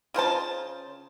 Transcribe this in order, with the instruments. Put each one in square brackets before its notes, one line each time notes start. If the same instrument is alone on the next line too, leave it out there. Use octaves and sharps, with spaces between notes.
[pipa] C#3 F4 C5 A5